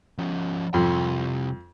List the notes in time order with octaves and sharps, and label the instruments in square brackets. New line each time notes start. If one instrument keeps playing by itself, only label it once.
[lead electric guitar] F3 C#4
[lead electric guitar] C2 C6 [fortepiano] F2